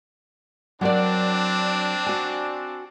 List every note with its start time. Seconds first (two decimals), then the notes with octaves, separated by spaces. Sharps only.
0.81 F#3 C4 D4 A#4 D5
2.06 F#4 G#5